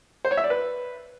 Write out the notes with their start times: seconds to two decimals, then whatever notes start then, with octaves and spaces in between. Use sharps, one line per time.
0.25 C5
0.31 C#5
0.37 E5
0.44 D5
0.50 B4